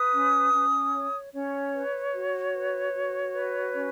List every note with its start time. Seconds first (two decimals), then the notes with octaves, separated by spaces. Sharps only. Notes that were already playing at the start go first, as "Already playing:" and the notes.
Already playing: B4 D#6
0.13 C#4
0.53 C#4
0.93 C#5
1.33 C#4 C#5
1.74 B4
2.14 F#4
2.54 B4
2.94 F#4
3.33 B4
3.73 C#4